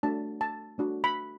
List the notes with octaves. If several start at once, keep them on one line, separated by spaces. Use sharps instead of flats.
A3 D4 F#4 A5
A5
A3 D4 F#4
B5